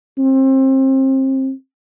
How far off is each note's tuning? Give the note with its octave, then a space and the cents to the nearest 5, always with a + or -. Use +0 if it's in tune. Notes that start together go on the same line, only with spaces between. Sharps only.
C4 +30